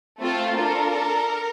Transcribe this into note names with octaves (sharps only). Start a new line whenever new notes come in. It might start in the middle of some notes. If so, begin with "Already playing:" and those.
A3 C4 F4 A4
D4 F4 A4 A#4
D4 A4